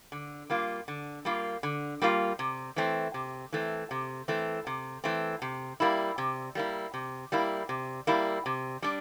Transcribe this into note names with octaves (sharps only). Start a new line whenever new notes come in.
D3
G3 A#3 F4
D3
G3 A#3 F4
D3
G3 A#3 F4
C3
E3 A3 C4
C3
E3 A3 C4
C3
E3 A3 C4
C3
E3 A3 C4
C3
G3 A#3 E4
C3
G3 A#3 E4
C3
G3 A#3 E4
C3
G3 A#3 E4
C3
G3 D4